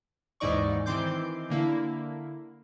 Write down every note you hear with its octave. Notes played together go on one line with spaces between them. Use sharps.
D#2 G#2 E3 D#4 D5 C#6
D#3 E3 C4 C6 D6 G6
D3 A#3 E4